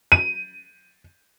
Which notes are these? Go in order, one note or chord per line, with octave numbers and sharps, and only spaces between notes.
D#7